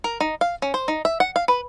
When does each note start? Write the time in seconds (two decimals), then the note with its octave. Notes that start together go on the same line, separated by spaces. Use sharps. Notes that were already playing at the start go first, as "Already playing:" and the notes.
0.04 A#4
0.20 D#4
0.41 F5
0.62 C#4
0.74 C5
0.88 D#4
1.05 E5
1.20 F#5
1.36 F5
1.48 B4